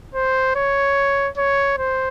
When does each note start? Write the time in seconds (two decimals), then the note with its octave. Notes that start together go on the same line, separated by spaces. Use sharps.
0.15 C5
0.55 C#5
1.37 C#5
1.78 C5